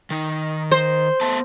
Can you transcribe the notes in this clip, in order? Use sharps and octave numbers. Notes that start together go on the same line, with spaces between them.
D#3 D#4
C5
A3 B3 A5